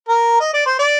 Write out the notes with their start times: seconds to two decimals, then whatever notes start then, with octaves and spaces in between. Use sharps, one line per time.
0.08 A#4
0.40 D#5
0.53 D5
0.66 C5
0.79 D5